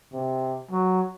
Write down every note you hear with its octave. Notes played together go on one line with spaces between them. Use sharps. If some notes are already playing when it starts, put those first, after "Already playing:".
C3
F#3